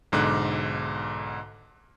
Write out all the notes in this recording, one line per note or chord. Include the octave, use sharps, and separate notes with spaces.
B1 G#2 D3 D6 F#6